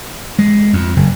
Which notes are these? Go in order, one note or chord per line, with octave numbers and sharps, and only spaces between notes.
G#3
F2
F#1